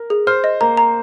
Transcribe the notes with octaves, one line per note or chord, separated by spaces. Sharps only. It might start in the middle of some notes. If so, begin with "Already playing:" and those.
Already playing: A#4
G#4
C5 F6
D#5
A#3 A#5
A#5